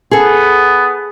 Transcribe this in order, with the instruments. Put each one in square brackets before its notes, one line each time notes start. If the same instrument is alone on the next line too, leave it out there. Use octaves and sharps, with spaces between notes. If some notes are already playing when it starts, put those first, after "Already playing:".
[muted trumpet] B3 [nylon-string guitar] G#4 A4